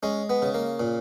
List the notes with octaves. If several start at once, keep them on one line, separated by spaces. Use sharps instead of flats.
G#3 C#4
B3
C#3
A#3
A#2